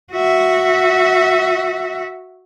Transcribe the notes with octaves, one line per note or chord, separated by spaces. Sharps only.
F#4 E5